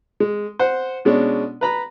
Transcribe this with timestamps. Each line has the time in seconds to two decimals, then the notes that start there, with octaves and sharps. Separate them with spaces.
0.20 G#3
0.59 C5 F#5
1.05 B2 G#3 C#4 D4
1.61 B4 A#5 B5